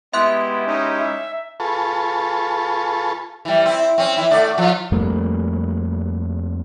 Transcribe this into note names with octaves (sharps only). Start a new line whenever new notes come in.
G#3 B3 E4 G4 E5 C6 F#6
C#4 D#4
E5
F4 G#4 A4 B4 A5 C#6
E3 G3
C4 E4
C4 C#4
E3 E4
D3 A3 D5
F3 F4
F2 G3 A3 A#3